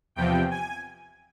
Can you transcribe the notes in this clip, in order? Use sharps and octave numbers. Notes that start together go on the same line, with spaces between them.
E2 C3 F3 G5
G#5